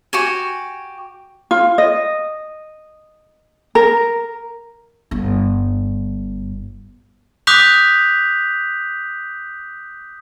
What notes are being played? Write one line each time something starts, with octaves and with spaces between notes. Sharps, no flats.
F#4 G4 G#5
F4
D#5
A#4
G1 G2
D6 D#6 F#6 G6 B6 F7